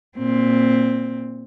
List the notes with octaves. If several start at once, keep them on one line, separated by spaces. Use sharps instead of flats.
A#2 C4